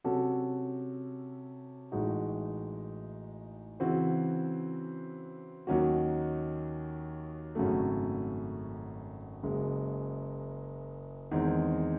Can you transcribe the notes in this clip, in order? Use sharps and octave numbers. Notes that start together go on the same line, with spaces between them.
C3 F#3 C#4 F#4 A4
A1 A2 G#3 D#4 F#4
C#3 E3 C4 F#4 C5
D#2 D#3 F#3 C#4 F#4
G#1 F#2 C#3 F#3 A3
F#1 F#2 C#3 G#3
E2 D#3 G#3 C4